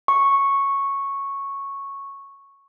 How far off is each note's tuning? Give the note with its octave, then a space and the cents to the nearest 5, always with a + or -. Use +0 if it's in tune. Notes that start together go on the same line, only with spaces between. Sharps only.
C#6 -5